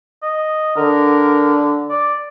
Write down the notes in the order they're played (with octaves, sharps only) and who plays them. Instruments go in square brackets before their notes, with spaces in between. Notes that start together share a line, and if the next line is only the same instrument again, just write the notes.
[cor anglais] D#5
[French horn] D3 [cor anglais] A#4
[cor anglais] D5